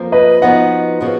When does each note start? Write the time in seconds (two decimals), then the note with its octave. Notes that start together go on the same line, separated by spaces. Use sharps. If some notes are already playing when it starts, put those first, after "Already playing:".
Already playing: F2 F3 A#3
0.12 B4 D#5
0.42 F3 B3 D#4 F#4 B4 D#5 F#5
1.01 C#3 F3 B3 F#4